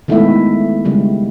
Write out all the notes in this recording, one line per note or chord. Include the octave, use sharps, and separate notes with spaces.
D#3 G#3 A3 B3 E4 E5
C#3 G3 G#3 A#3